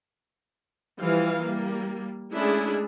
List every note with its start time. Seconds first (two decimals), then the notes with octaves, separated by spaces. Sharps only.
1.01 E3 F3 G3 F5
1.40 G3 A#3
2.34 G#3 A3 C#4 D4 E4 G#4